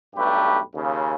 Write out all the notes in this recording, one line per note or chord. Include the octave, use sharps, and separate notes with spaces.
B1 G2 A3 G4 B4
D#2 C#3